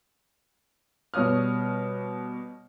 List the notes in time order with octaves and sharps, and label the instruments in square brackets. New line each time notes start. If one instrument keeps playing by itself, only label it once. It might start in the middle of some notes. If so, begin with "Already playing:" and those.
[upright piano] B2 G3 C#5 D#6 F6